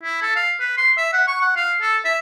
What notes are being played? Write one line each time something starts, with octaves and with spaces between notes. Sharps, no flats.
E4
A4
F5
B4
C6
E5
F#5
C#6
F#5
F5
A4
E5